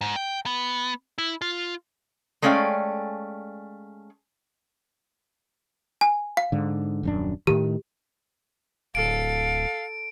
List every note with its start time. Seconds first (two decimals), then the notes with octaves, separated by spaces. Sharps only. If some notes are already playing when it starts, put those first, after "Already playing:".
0.01 G#2
0.16 G5
0.46 B3
1.18 E4
1.42 F4
2.42 G#3 A3 C#4 D5 F5 G5
6.01 G#5
6.37 F5
6.52 G#2 D3
7.03 D#1 F#2 D4
7.47 A2 D#3 G4
8.95 D1 A4 F5 D7